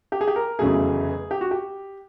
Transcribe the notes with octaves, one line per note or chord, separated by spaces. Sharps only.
G4
G#4
G4
A#4
F1 E2 C#3 F#3 A3 G#4
G4
F#4
G4